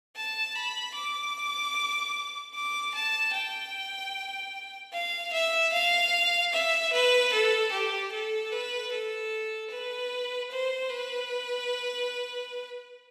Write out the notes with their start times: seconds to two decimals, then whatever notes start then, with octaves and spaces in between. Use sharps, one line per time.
0.16 A5
0.55 B5
0.95 D6
2.54 D6
2.94 A5
3.34 G5
4.93 F5
5.33 E5
5.73 F5
6.53 E5
6.93 B4
7.33 A4
7.72 G4
8.13 A4
8.52 B4
8.92 A4
9.71 B4
10.51 C5
10.90 B4